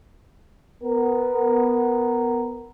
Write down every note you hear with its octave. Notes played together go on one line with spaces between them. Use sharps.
B3 A#4